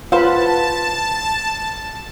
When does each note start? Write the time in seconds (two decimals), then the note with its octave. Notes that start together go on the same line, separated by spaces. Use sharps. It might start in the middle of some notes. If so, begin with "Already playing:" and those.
0.12 F4 B4 C5 F5 F#5 A5 B5